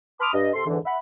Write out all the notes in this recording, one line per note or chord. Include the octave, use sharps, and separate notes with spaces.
A5 B5 C6 D6 D#6 F6
G2 D#5
C3 A4 C6
E2 G#2 D3 E3
E5 F#5 B5